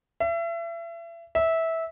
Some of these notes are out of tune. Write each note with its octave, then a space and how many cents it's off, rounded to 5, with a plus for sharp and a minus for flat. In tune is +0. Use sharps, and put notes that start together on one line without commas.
E5 +35
E5 -15